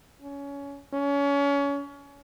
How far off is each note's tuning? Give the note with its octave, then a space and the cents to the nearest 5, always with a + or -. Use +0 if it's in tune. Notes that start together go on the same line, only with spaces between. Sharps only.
C#4 +20
C#4 +30